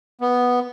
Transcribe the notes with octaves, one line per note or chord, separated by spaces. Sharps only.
B3